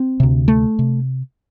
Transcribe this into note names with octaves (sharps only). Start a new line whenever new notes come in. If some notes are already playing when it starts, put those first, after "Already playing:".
Already playing: C4
D2 C3
A3
C3